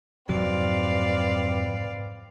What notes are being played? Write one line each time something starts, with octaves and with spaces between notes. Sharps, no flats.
F2 G#2 C3 F#3 C4 B4 D5 F5